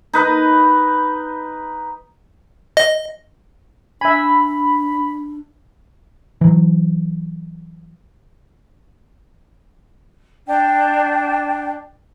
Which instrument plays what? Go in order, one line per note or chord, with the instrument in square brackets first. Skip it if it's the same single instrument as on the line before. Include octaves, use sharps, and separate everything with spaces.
[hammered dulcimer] D#4 B4 D#5
[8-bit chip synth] D#5
[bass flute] D4 [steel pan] E5 G#5 [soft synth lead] B5
[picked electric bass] E3 F#3
[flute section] D4 G5